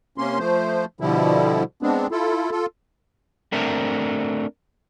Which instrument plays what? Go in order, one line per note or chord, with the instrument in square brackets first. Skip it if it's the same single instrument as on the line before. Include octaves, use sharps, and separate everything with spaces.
[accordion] C3 A#3 C#4 C6
F3 A3 C5
B2 D3 F3 G3 E4
G#3 B3 C4 D4
E4 F4 A4
F4 A4
[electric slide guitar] A3 C4 D4 A#4 C5 E5